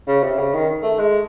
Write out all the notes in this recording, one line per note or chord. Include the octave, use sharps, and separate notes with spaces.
C#3
C3
C#3
D#3
A3
G#3